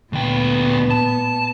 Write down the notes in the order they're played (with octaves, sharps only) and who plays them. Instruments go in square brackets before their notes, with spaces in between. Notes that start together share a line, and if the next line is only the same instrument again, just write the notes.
[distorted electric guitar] D2 G5 [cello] A#2 B3
[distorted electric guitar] A5